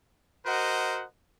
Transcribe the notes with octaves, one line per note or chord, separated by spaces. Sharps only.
F#4 A#4 C5 D#5 F#5